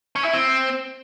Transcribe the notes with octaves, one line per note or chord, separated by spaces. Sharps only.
C#4
E4
C4